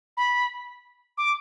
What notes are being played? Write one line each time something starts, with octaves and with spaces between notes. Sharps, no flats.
B5
D6